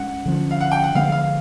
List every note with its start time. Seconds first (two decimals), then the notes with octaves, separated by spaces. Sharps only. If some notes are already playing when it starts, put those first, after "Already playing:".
Already playing: G#3 C#4 F#5
0.26 D3 F3 A3 C#4
0.51 F5
0.61 F#5
0.72 G5
0.84 F#5
0.95 D3 F3 G#3 B3 F5
1.12 F5